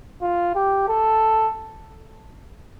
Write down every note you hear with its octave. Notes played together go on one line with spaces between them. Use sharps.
F4
G4
A4